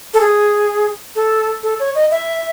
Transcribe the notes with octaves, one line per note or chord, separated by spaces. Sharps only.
A4
G#4
A4
A4
C#5
D#5
E5